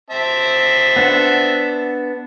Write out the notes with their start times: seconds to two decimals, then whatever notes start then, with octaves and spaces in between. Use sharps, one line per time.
0.10 C4 E5 A5
0.96 B3 D4 F#5